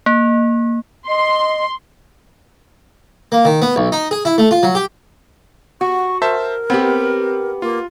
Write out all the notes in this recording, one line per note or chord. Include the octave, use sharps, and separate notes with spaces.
A#3
D#5 C6
A#3
D#3
B3
B1
D#4
G#4
E4
A3
F4
F#3
G4
F#4 C#6
A#4 C5 E5 A5
B3 C4 G4
A#3 F4